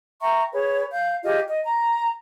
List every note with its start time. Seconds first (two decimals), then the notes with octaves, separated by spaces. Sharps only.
0.21 E5 G5 A#5 C#6
0.52 G#4 B4 C#5
0.92 F5 G6
1.23 F4 G4 G#4 D#5
1.47 D#5
1.64 A#5